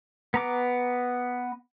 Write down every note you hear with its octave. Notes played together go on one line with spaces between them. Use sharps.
B3 A#5 D6